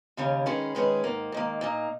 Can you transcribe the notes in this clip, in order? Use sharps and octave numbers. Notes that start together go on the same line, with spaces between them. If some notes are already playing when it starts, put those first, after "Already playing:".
D#2 C#3 G3 C#4
D#3 G#3 C#4 G#4 B4
D#3 G#3 C#4 G#4 B4
G#2 D#3 A#3
G#2 D#3 A#3
A#2 A#3 D#4